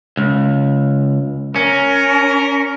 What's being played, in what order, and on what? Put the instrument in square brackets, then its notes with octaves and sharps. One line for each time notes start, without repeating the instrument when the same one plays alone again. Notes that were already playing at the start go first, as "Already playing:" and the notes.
[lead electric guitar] C#2
[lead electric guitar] C#4 [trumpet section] A#4